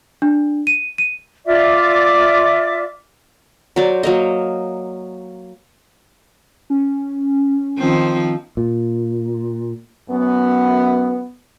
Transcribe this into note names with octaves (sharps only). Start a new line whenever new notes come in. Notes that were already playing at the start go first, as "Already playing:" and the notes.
D4
D#7
D#7
F4 D5 E5 D6
F#3 A#4 C5 D5
F#3 A#3 D#5
C#4
D#3 F3 C4
A#2
F#2 B3